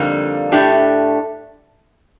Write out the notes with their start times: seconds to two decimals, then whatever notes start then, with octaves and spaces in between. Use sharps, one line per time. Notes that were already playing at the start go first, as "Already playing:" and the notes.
Already playing: F2 D3 G3 A#3 D#4
0.52 A2 A3 D4 G4